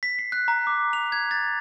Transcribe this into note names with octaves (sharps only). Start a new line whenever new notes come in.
B6
C7
F#6
A#5
D6
F7
G#6
A6